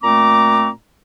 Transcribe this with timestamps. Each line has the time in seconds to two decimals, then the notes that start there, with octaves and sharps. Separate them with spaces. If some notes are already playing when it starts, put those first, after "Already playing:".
0.02 A#2 A3 C4 A#5 D6